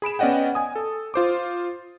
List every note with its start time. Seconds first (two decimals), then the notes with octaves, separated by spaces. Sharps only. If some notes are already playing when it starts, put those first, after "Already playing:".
0.02 G#4 B5 D7 E7
0.19 B3 C#4 D5 D#5 F#5 G5
0.55 G#5 D#6
0.76 A4
1.14 F4 C5 D6